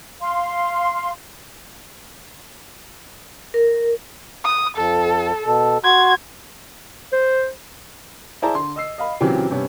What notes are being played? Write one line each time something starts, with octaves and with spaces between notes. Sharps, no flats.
F5 C6
A#4
D#6
F2 A4
B2 A4
F#4 C6 G#6
C5
E4 G#4 C5 D5 A5 A#5
D3 C6
D#5 E6 C7
D#5 F5 B5
A#2 C#3 E3 F#3 C4 G4
G2 C3 B3 C#4